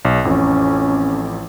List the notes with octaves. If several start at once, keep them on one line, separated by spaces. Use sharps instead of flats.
B1
A1 F2 C#4